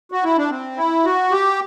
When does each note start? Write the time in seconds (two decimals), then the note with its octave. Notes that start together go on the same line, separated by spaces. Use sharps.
0.12 F#4
0.24 E4
0.38 D4
0.50 C4
0.77 E4
1.05 F#4
1.32 G4